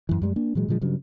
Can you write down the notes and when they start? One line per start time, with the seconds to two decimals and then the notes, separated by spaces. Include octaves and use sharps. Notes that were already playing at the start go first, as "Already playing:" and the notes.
0.09 F#2 E3
0.22 F#2 G3 G#3
0.36 A#3 D4
0.55 A#2 E3 F#3 G#3
0.68 A#2 D3 F3 G#3
0.81 G2 C#3 F#3